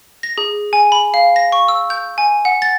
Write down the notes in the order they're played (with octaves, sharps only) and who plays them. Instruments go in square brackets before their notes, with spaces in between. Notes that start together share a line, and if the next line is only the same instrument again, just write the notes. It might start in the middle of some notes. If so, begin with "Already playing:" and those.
[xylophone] A#6
G#4
G#5
B5
F5
A#6
C#6
E6
G6
G#5
F#5
A6